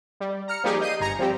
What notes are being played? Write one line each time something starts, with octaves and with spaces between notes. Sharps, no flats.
G3
A#5 F6 C#7
F3 G3 A#3 D#4 G4 G#4
D#5 G6 C7 D#7
G1 G#5 A#5 A#6 C#7
F3 G3 C4 G4